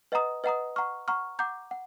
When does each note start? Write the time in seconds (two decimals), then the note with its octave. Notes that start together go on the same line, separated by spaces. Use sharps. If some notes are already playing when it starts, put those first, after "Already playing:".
0.12 B4 D#5 F#5 A#5 D#6
0.44 B4 D#5 F#5 A#5 D#6
0.76 F#5 A#5 C#6 F6
1.08 F#5 A#5 C#6 F6
1.39 F#5 A#5 D6 G6
1.71 F#5